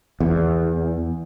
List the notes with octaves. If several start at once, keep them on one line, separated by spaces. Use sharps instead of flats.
E2